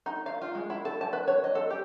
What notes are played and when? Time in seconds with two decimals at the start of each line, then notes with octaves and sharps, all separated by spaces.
0.06 D#4
0.26 F5
0.42 F4
0.55 G#3
0.70 E4
0.85 A4
1.01 A5
1.13 B4
1.28 C#5
1.44 D#5
1.55 A4
1.70 G4